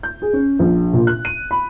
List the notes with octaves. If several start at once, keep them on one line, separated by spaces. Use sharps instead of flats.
G6
G#4
C#4
A#1
A#2
F#6
D#7
B5